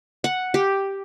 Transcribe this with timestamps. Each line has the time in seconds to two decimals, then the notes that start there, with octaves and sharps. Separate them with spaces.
0.24 F#5
0.54 G4